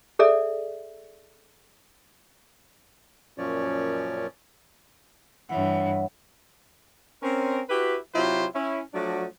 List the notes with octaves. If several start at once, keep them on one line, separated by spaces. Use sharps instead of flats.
G#4 A4 D5 E5
F#2 A#2 F3 C#4 C#5 D5
G2 E3 C#5 E5 F#5
C4 C#4 A#4
E4 F#4 G4 B4
C3 F#3 E4 F4 G4 C5
C#4 E4
F3 F#3 A3 D4 F#4 D5